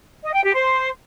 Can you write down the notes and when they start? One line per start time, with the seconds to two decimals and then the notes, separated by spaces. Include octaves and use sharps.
0.23 D#5
0.34 G5
0.44 G4
0.55 C5